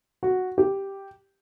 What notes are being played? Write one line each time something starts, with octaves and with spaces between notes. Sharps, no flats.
F#4
G4